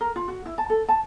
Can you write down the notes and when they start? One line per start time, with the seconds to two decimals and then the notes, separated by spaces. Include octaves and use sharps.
0.01 A#4
0.16 F4
0.28 F#4
0.46 E4
0.58 A5
0.70 A4
0.89 A5